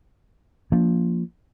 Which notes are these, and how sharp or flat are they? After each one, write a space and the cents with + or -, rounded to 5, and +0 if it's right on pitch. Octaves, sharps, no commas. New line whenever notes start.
F3 +0 A#3 +0 D4 -35